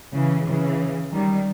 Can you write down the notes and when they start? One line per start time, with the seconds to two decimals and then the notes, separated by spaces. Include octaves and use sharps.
0.14 C#3 E3
0.47 C#3 E3
1.13 D#3 G3